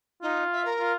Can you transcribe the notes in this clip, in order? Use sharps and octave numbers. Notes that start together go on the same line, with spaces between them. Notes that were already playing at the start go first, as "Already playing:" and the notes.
D#4 F4
E5
A#4
F4